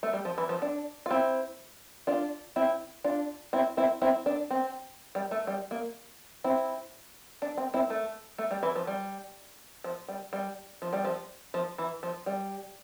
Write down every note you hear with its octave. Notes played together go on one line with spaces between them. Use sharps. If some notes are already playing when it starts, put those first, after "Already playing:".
A3
G3
F3
E3
F3
D4
F4
C4 E4
D4 F4
C4 E4
D4 F4
C4 E4
C4 E4
C4 E4
D4
C4
G3
A3
G3
A#3
C4 E4
D4
C4
C4 E4
A3
A3
G3
E3
F3
G3
F3
G3
G3
F3
G3
F3
F3
E3
F3
G3